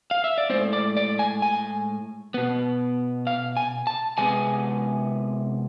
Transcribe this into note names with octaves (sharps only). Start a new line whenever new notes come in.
F5
E5
D5
A2 G#3 C4 C5
D5
D5
G#5
G#5
B2 B3
F5
G#5
A5
C3 G#3 B3 G#5